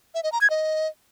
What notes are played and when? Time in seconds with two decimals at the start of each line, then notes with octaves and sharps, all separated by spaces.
0.15 E5
0.23 D#5
0.32 A#5
0.41 G#6
0.50 D#5